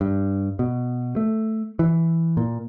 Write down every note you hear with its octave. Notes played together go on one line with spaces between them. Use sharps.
G2
B2
A3
E3
A#2